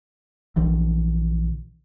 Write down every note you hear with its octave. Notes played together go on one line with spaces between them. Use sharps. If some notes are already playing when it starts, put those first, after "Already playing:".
A#1 D3 E3